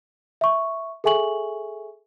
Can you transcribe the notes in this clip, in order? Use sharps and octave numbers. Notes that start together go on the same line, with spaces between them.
E5 C#6
G#4 A4 E5 G#5 C#6 F#7